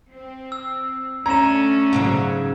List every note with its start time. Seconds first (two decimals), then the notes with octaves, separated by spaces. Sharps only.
0.11 C4
0.52 E6
1.26 D3 A3 C#4 A#5 G#6 E7
1.93 G#2 C#3 F#3